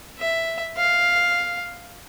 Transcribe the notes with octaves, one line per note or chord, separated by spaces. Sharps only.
E5
F5